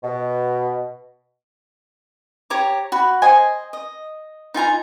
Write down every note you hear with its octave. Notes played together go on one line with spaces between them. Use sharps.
B2
G4 C#5 A#5 D6
F#4 B5
C5 D#5 G#5
D#5
D#4 F4 G#5 A#5